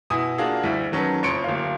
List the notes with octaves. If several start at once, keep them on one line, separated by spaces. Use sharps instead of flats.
B2 E4 G#5 D#6
A#3 D4 F4 F#4 G#4
D2 G3 E4
D#3 F#3 C#4 A4 B4
F#1 F2 C#5 C6 C#7 D7
D1 A#3 F5